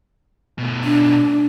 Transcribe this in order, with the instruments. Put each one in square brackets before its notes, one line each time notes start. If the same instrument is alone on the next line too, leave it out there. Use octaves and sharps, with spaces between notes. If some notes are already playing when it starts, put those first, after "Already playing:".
[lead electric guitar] B2 A3
[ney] D4